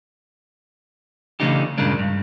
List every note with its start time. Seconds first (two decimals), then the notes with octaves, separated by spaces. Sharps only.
1.40 C#3 E3 A3 D4 D#4 G4
1.78 G2 A#2 C#3 G#3 A#3 D4
1.99 G2